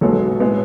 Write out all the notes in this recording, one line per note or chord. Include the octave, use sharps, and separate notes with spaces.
B1 B2 G#3 B3 A4 C#5
A2 G#3 B3